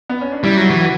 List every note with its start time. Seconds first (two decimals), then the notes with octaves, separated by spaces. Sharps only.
0.10 B3
0.21 C#4
0.32 D4
0.43 G3 E4
0.57 F#3
0.62 F#4
0.70 E3
0.81 F#4